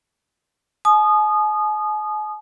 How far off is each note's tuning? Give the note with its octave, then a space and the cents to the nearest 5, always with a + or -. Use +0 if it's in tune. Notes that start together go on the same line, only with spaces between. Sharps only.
G#5 +45 D#6 -20